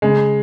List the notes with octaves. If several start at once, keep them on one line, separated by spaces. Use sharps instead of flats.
C#3 G#3